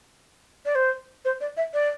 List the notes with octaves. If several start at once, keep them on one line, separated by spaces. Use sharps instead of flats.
D5
C5
C5
D5
E5
D5